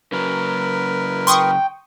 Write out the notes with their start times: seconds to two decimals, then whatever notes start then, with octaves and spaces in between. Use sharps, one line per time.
0.12 C#3 F#3 A#4 B4
1.27 G5 C6 C#6 D#6